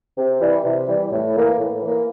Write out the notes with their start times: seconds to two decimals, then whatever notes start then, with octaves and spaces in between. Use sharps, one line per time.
0.17 C3
0.41 E3 G3
0.64 C3
0.88 E3 G3
1.11 A2
1.34 E3 A#3
1.58 A2
1.81 E3 A#3